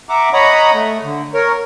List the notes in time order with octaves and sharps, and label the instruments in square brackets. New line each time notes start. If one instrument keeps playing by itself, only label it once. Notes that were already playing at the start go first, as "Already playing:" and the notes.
[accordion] E5 F#5 A#5 D6
C#5 D#5 F#5 A#5 B5 D#6
A3
D3
A#4 C#5